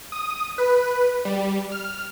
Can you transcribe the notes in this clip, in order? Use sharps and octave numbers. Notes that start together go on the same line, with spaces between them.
D#6
B4
G3
F6